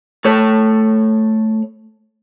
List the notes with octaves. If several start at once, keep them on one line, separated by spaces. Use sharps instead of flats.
A3 C#5